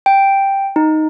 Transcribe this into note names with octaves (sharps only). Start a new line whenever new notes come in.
G5
D#4